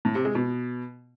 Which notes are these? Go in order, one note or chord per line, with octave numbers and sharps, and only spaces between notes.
A2
C3
G#3
B2